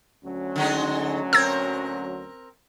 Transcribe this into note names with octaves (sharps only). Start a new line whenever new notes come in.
D2 F#3 C#4
D3 G#3 D#4
C4 A#4 E6 G#6